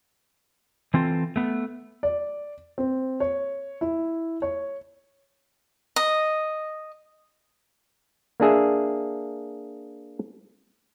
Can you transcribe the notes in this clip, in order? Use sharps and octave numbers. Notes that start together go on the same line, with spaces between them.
E3 C4 F4 A4
A3 B3
D5
C4
C#5
E4
C#5
D#5
A#3 D4 G#4 E5